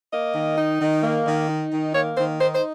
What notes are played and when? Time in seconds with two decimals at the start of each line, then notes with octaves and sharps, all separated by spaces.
0.11 A#3 D#5
0.34 D#3
0.57 D#4
0.80 D#3
1.02 A#3
1.26 D#3
1.48 D#4
1.71 D#3
1.93 A#3 C#5
2.16 D#3 C5
2.39 D#4 C5
2.53 C5